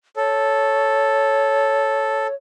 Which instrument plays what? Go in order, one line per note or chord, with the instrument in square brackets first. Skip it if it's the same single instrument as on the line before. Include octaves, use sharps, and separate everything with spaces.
[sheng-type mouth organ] A4 [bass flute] C#5